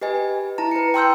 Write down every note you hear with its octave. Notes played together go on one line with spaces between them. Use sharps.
G4 B4 D#5 G#5
E4 A5 A#5
B4 C#7
G5 A5 C6 E6 F6 G6